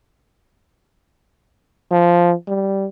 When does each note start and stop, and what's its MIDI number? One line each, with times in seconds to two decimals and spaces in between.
1.91 2.34 53
2.48 2.87 55